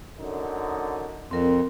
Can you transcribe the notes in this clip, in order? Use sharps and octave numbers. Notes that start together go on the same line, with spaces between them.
F#2 D3 D#4
F2 C4 A#4